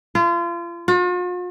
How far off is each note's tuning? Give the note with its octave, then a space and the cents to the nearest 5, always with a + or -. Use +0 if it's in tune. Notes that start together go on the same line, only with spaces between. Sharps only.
F4 -35
F4 +45